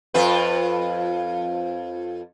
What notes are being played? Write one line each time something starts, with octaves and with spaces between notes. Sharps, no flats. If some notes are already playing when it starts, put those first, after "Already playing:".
F2 F4 B4